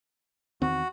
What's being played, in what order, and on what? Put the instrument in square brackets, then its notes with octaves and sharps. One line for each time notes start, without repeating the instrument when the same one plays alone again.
[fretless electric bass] E2 D#3 C4 [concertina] F#4